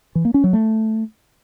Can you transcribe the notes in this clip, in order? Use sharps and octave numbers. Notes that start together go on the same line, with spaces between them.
E3
A#3
C#4
F#3
A3